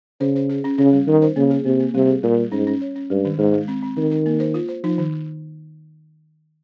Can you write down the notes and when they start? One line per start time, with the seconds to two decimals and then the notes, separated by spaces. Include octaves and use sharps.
0.20 C#3 C5
0.35 C5
0.49 G#4
0.64 C#4
0.78 C#3 C#4
0.93 G3
1.07 D#3 G3
1.22 C5
1.36 C#3 A#3
1.51 G#4
1.65 C3 A#3
1.80 A#3
1.94 C3 G3
2.08 G#4
2.23 A#2 G3
2.38 G3
2.52 G#2 C#4
2.67 C#4
2.82 C#5
2.96 C#4
3.10 G2 G#3
3.25 D#3
3.38 G#2 G#3
3.53 G#3
3.68 C4
3.83 C4
3.97 D#3 C4
4.11 A#4
4.26 A#3
4.40 C5
4.54 F4
4.69 C5
4.84 F3 D#4
4.98 D#3